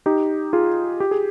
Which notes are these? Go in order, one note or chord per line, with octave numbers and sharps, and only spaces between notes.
D#4 G4
F4 G#4
G4
G#4